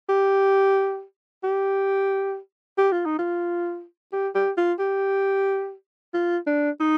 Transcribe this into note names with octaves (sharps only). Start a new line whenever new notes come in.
G4
G4
G4
F4
D#4
F4
G4
G4
F4
G4
F4
D4
D#4